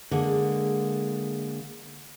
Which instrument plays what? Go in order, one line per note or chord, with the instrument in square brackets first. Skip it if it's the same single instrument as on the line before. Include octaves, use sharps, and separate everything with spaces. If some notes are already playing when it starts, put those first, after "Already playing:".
[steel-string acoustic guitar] D3 G#3 A#3